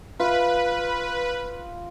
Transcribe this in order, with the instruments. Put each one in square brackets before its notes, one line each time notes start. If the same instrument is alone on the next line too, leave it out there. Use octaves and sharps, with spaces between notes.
[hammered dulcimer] F4 [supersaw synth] B4